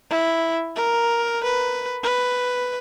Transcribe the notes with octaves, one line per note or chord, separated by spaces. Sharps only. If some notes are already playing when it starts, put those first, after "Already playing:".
E4
A#4
B4
B4